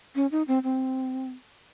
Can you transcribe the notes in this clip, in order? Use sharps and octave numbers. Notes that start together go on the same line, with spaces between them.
C#4
D#4
C4
C4